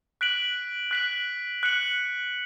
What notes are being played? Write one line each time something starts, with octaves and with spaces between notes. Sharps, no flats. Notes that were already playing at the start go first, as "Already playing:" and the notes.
F#6 B6 D7 F#7
F#6 B6 D7 F#7
F#6 C#7 F#7